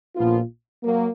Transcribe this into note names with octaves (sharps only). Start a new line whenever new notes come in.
A#1 A#2 F3 B3 F4
F#3 A#3